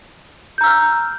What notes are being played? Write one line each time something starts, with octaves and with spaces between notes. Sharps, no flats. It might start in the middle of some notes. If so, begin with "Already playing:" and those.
A#5 E6 F6 G6